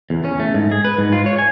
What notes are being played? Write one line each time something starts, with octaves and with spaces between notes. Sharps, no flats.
E2
C#4
A3
G#2
G#4
B4
G#2
F4
C#5
G#5